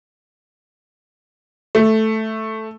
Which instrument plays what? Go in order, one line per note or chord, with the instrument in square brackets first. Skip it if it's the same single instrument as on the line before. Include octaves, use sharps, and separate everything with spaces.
[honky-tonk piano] A3